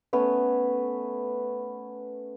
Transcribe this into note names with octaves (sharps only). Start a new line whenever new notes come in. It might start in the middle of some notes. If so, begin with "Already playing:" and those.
A3 B3 C#4